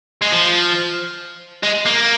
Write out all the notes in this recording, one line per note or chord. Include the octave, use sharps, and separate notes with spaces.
G#3
F3
G#3
A#3